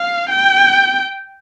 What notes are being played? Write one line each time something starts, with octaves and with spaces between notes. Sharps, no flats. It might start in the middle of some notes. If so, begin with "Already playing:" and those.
Already playing: F5
G5